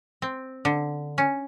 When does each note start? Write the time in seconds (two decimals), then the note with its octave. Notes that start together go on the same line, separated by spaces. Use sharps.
0.22 C4
0.65 D3
1.18 C#4